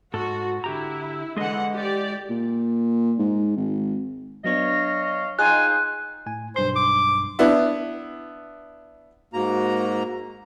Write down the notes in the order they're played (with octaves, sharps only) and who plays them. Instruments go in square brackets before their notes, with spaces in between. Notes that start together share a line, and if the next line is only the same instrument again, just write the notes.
[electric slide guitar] G#2 A4 [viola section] F#4
[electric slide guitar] D3 G4 A#5 [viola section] E4
[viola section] D3 E3 F#5 [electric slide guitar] G#3 G#4 D#5
[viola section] G4 D5
[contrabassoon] A#2
G#2
G#1
[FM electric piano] F#3 B3 D4 [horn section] C#5 D#5 F5 [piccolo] A#6
[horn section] D#4 F4 C5 [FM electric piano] G#4 D#5 G5 [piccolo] G#5 [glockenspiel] F#6
[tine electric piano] A2 G#5
[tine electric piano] B1 G2 C6 [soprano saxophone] C5
[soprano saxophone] D6
[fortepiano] B3 D4 E4
[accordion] G#2 A#3 A#5 [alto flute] F#4